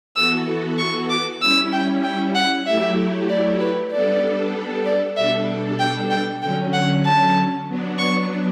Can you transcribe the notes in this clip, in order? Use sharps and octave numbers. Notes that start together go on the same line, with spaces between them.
E3 B3 F#4 A4 E6
C#6
D6
G3 C#4 E4 E6
G5
G5
F#5
F#3 A3 E4 G4 E5
D5
B4
G3 B3 D4 A4 D5
D5
B2 G3 D4 A4 E5
G5
G5
D3 F#3 C#4 G5
F#5
A5
F#3 B3 D4
C#6